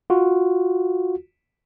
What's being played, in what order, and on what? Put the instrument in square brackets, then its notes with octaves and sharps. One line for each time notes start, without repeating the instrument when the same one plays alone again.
[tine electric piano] F4 F#4